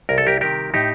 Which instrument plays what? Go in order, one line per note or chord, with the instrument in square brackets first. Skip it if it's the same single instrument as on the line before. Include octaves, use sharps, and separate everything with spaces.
[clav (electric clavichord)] C2 A#4
A4
G4 A#4
C3 D#3 G3 G4 A#4
A2 D#4 G4